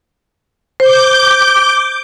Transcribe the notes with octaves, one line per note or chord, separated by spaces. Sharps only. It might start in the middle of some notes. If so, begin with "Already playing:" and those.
C5 D6 G6